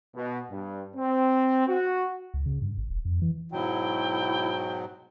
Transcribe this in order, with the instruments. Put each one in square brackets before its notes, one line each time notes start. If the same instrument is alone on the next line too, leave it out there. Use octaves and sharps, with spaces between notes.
[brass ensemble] B2
G2
C4
F#4
[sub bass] C#2
C#3
G2
G#1
E1
F2
E3
[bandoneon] G#2 B2 F#3 [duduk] E4 [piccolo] G5